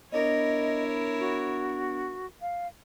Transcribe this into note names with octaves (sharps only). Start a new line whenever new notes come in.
B3 D4 E4 A#4 C#5 D#5
F#4
F5